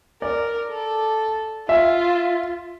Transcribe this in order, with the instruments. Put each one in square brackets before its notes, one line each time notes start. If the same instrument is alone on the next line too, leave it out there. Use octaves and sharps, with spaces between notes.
[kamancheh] A#4 [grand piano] D5
[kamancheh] A4
[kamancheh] F4 [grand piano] E5